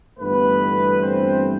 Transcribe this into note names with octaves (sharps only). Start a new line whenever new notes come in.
G1 G2 E3 A3 B3 B4
C4 C5